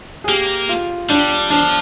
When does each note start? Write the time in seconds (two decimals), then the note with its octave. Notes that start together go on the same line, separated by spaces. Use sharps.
0.24 G#4
0.28 A#3 G4
0.69 F4
1.10 G3 D4
1.50 F3 D4